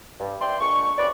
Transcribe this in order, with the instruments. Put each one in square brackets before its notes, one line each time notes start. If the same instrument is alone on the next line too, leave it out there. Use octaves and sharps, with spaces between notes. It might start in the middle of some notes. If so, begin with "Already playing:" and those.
[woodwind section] G2
D5 E5 G5 C6
A#2 G#3 D4 C#6
C2 F#2 B4 D5